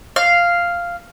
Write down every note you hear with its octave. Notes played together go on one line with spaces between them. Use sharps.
F5